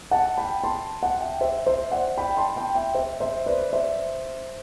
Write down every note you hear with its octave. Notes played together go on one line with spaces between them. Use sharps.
F#5 A5
G5 B5
A5 C6
F#5 A5
E5 G5
C5 E5
C5 E5
D5 F#5
G5 B5
A5 C6
G5 B5
E5 G5
C5 E5
C5 E5
B4 D5
C5 E5